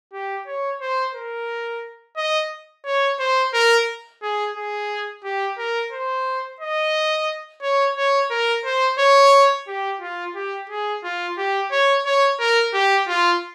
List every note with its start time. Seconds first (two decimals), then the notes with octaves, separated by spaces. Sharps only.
0.13 G4
0.47 C#5
0.81 C5
1.15 A#4
2.17 D#5
2.85 C#5
3.19 C5
3.54 A#4
4.22 G#4
4.56 G#4
5.24 G4
5.58 A#4
5.92 C5
6.60 D#5
7.62 C#5
7.97 C#5
8.31 A#4
8.65 C5
8.99 C#5
9.67 G4
10.01 F4
10.35 G4
10.69 G#4
11.04 F4
11.37 G4
11.71 C#5
12.06 C#5
12.40 A#4
12.74 G4
13.08 F4